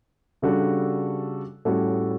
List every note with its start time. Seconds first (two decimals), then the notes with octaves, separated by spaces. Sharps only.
0.42 C#3 G3 D4 F#4 A4
1.65 A2 G3 C#4 F#4 A4